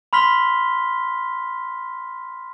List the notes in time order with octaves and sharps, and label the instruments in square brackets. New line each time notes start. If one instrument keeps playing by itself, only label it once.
[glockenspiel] B5 C6 F6 B6 G7